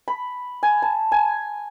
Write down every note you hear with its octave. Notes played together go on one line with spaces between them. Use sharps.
B5
G#5
A5
G#5